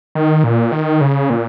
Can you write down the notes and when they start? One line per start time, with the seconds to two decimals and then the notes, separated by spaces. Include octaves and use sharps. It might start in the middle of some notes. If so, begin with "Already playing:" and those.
0.15 D#3
0.44 A#2
0.72 D#3
1.01 C#3
1.30 A#2